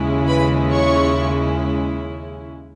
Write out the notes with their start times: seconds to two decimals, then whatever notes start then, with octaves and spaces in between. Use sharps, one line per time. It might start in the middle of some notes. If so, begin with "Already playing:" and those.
Already playing: D#2 C#3 G#3 C#4 E4
0.28 B4 B5
0.72 C#5 C#6